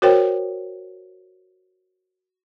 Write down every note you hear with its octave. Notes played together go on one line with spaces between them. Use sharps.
F#4 A#4 C5 C#5 G5